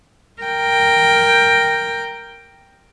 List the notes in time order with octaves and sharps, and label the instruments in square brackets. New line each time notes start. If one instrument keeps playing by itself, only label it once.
[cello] A#4 G5